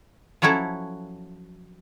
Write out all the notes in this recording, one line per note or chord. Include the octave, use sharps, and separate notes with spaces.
F3 F#3 C#4 E4 A4